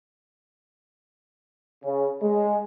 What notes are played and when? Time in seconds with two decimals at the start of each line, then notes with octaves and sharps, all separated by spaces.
1.84 C#3
2.23 G#3